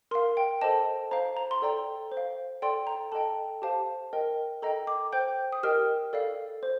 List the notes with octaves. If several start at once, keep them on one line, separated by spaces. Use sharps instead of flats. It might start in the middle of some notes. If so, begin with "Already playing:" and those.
A#4 F5 C6
G5
A4 C5 D#5 A5
C5 F5 A#5
A#5
C6
A4 D5 G5 A#5
C5
F5
A4 D5 G5 C6
A#5
A4 D#5 G5 A5
G4 C5 F5 A5
A#4 D#5 G5
A4 D#5 G5 A#5
D6
C5 G5 G6
D#6
G4 A#4 D#5 G5 F6
A4 D5 F5
C5